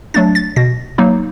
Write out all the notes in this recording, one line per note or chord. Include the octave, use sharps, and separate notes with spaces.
F#3 A3 D4 A6
A6
B2 A#6
F#3 A#3 D#4